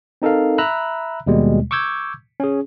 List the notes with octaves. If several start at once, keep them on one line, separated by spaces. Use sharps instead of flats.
C4 D#4 A4 A#4 F5
E5 A#5 B5 E6 F#6
D#2 B2 G3 G#3
C#6 D6 E6 G6 G#6
C#4 G#4